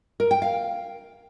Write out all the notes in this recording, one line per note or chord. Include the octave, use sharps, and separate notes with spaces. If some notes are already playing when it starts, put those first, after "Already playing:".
A#4
G5
F5